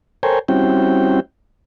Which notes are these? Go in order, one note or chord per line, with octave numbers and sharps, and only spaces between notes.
A4 A#4 C5 C#5 G5 G#5
G3 C4 C#4 E4 F#4 G5